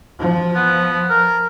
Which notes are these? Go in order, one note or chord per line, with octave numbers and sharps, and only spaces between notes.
F3
B3
A#4